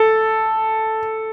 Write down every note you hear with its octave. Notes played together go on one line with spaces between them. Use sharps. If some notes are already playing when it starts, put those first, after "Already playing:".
Already playing: A4